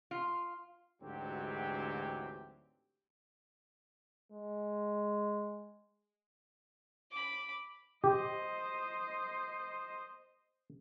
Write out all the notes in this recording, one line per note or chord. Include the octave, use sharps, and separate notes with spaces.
F4
D2 G#2 E3 F#3 C4 G4
G#3
B5 D6
G4 C5 D#5